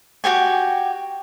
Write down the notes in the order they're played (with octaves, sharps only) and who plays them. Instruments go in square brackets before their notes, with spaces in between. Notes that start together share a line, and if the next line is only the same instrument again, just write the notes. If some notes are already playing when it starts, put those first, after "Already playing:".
[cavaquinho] F#4 G4 G5 G#5